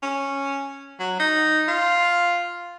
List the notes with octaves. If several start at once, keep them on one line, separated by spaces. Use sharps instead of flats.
C#4
F#3
D#4
F4